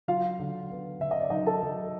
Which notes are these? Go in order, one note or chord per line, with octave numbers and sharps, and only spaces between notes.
F#3 F4 F5
D3
B3
D3 E5
D#5
D5
F#3 D#4 D#5
A4 A5
F#3